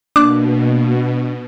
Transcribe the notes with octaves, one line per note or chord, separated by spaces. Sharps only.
B2 A#3 D4 D6 F#6